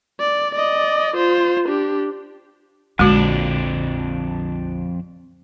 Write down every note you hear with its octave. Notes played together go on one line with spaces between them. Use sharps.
D5
D5 D#5
F4 C5
D4 G4
A#1 F2 D3 G#3 D4 F#4